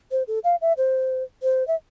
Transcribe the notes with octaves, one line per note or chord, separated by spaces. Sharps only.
C5
A4
F5
E5
C5
C5
E5